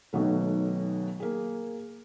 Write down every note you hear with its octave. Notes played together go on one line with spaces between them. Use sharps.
B1 B2 D#3 F#3 A3
A#3 G#4